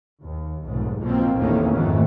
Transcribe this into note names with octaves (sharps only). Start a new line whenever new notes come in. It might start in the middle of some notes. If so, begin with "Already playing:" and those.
D#2
F1 B1 G#2
B2 F3 A#3 C4
A1 E2 A2 D#3 A#3 C#4
F2 G#2 D#3 A3